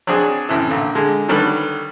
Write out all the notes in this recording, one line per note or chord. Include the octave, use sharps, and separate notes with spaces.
F#3 C4 D4 G#4
F#2 A2 C3 E3
A#1 D3
D3 G#3
D3 D#3 F#3 G3 A4 B4